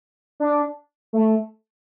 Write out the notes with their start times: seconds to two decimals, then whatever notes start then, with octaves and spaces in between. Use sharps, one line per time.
0.40 D4
1.13 A3